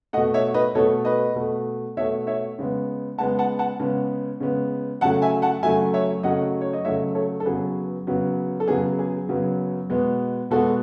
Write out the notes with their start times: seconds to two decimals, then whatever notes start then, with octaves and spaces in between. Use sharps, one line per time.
0.13 A3 D#5 F#5
0.17 B2
0.34 C#5 E5
0.54 B4 D#5
0.75 B2 A3 A4 C#5
1.05 B4 D#5
1.35 B2 A3
1.97 B2 A3 C#5 E5
2.27 C#5 E5
2.58 C#3 G#3 B3
3.18 C#3 G#3 B3 F#5 A5
3.39 F#5 A5
3.59 F#5 A5
3.80 C#3 G#3 B3
4.40 C#3 G#3 B3
5.01 F#2 C#3 F#3 A3 F#5 A5
5.22 E5 G#5
5.42 F#5 A5
5.63 F#2 C#3 F#3 A3 E5 G#5
5.94 C#5 E5
6.23 F#2 C#3 F#3 A3 D#5 F#5
6.61 C#5
6.73 D#5
6.85 F#2 C#3 F#3 A3 C#5 E5
7.15 A4 C#5
7.40 A4
7.45 F#2 C#3 F#3 B3 G#4 B4
8.07 F#2 C#3 F#3 B3
8.60 A4
8.68 F#2 C#3 F#3 B3 G#4
8.99 G#4
9.29 F#2 C#3 F#3 B3
9.90 B2 G#3 B3
10.51 B2 G#3 B3 F#4 A4